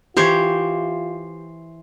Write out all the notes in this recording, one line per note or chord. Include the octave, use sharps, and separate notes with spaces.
E3 F4 G4 C5 C#5